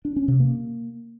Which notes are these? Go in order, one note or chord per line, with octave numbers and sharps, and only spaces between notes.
D4
C#4
C3
A#3